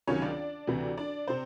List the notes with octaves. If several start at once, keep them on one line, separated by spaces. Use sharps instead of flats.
C#2 C3 D#3 F#3 C#4 C#5
D4 D5
D2 C3 E3
D4 D5
C3 C4 C5